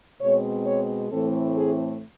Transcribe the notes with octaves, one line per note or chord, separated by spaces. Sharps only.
B2 G#3 C4 C#5
C#5
A2 E3 A3 C4 A4
G#4